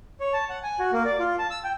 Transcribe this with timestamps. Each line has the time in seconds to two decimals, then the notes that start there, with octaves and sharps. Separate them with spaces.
0.20 C#5
0.33 A5
0.50 F#5
0.63 G#5
0.79 F#4
0.93 A#3
1.05 D5
1.19 F4
1.39 A5
1.51 E6
1.64 G5